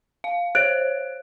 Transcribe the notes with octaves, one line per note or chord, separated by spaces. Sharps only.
F5
C5 C#5 F#6 D7